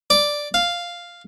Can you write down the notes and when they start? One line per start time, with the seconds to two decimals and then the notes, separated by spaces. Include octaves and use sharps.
0.10 D5
0.54 F5